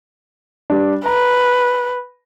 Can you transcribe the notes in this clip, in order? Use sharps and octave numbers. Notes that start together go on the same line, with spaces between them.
G3 D4
B4 A#5